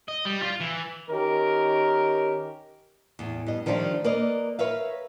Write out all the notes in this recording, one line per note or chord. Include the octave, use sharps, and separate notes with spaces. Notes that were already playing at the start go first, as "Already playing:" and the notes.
D#5
G3
F4
E3
D#3 C#4 G4 A#4
E2 A2
G2 D#5
D#3 F3 G3 A3 D4 F4
A#3 A#4 B4 D5 D#5
A#4 B4 C#5 E5 F5